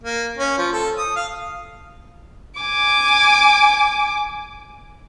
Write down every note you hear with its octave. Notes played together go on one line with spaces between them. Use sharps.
A#3
C#4
F3
A4
D#6
F5
G#5 D6